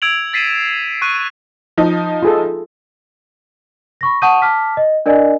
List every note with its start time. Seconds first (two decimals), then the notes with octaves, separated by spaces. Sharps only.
0.02 E6 G#6 D7 F7 F#7
0.33 A6 B6 C7 D#7 E7 F#7
0.51 E7
1.02 C#6 F#6 D#7
1.78 F3 D#4
2.23 F4 G#4 A4
4.01 B5 C#6 A#6
4.22 F#5 A5 C#6 D#6 G6 D#7
4.42 A5 D6 F6 B6
4.77 D#5
5.06 D4 A#4 D5 D#5 G#5